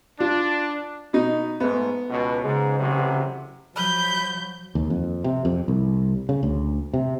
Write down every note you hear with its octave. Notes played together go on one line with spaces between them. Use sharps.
D4 F4
B2 D#4
G#2 A3 B3
C#2 B2
G#2 C#3
A1 C3 F#3
F3 F#3 B5 G6
D#2
F2
C3
F2
C2
C#3
D2
C3